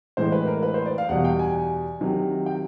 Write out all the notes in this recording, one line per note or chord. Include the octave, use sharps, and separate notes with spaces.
A2 E3 G#3 C5
B4
A#4
B4
C5
D5
F5
E2 B2 G3 F#5
G5
G#5
C3 D#3 F#3
G5